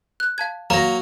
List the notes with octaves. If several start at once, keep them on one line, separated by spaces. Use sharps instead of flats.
F#6
F5 A5 G#6
F#3 A#3 A#5 A#6